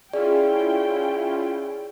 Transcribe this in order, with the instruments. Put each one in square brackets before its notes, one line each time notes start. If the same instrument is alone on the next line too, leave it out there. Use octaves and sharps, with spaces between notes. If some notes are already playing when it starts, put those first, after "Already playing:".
[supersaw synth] C#4 E4 F4 [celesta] G#4 [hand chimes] D5 [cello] G5